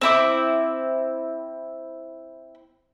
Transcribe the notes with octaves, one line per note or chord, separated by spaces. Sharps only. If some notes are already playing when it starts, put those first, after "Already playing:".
C4 E4 D6